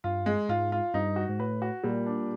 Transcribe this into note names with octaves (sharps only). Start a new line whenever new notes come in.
G2 F4
G#3
G#2 F4
F4
G2 D#4
F#4
G#2
A2 B4
F#4
A#2 G3
D4